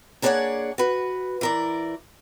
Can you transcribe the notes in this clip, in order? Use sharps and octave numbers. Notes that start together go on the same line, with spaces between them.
A#3 D4 G#4 C#5 D5 F#5
F#4 B4
E3 A#4 D5